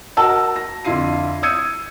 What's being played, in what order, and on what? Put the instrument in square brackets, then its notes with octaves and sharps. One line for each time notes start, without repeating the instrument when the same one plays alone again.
[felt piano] F#4 A#4 D#5 F#5 A5 E6
A#6
F2 D3 E4 F4 C7 D#7
D#6 E6 G6 G#6 C#7 D#7